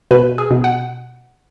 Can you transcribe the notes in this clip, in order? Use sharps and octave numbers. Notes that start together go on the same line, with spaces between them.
B2 B4
G#4
B2
F#5